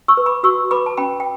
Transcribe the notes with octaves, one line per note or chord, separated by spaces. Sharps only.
C#6 E6
B4
B5 D6
F#4 C#6 E6
B4 B5 D6
A5
C#4 G5 B5
G5